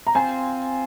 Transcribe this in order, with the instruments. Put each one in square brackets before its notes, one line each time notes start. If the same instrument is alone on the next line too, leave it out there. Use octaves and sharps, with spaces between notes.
[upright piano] A#5
[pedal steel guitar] C4 F4 C5 [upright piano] G#5